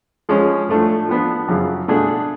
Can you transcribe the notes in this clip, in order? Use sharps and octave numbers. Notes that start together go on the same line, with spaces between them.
F3 G#3 C#4
A2 F3 A3 D4
F3 B3 D4
F#2 C#3 F3
B2 A3 D4 G#4